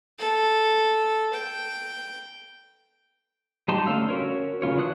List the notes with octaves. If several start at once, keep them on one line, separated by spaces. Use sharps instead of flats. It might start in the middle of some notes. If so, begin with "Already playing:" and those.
A4
G5
G3 D#4 G4 A5 C6
D3 A3 C#4 F5 E6
C#4 F#4 A#4 C#5
C#3 A#3 F4 C#5
E3 D4 F#4 D#6 F#6